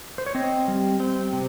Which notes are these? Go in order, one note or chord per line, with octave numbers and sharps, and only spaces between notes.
C5
C#5
C4 D#5
G3
C4
C3